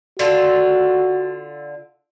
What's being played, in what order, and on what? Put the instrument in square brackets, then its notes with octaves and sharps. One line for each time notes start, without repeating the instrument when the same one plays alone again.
[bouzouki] D3 F4 A4 [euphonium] F#4